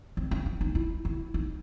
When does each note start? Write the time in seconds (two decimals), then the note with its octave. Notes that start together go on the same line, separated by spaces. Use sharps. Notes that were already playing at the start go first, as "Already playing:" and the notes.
0.17 C4
0.31 C#4
0.46 D4
0.61 D#4
0.75 E4
1.05 E4
1.34 D#4